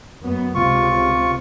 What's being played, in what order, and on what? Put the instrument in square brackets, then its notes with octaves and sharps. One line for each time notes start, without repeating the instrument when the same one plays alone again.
[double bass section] F#2 B3
[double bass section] C#2 C3 [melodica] F4 C#6